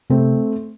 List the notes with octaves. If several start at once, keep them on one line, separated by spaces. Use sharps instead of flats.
C3 A3 C4